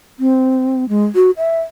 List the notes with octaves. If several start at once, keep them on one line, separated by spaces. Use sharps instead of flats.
C4
G#3
F#4
E5